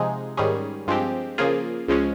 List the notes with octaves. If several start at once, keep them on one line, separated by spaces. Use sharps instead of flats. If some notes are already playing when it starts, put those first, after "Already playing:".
Already playing: C3 F3 G#3 D#4 G#4
G#2 D#3 G3 C#4 G#4
G2 F3 G#3 C4 G4
C#3 F3 A#3 F4 G#4
C#2 C#3 F3 G#3 C#4